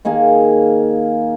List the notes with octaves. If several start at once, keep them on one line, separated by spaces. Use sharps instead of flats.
D#3 A#3 G#4 F5